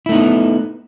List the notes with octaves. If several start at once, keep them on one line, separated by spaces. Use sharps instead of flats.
A3 B3 D#4 E4